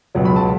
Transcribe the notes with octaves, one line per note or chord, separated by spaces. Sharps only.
C#2 B2 F#3
B5
A5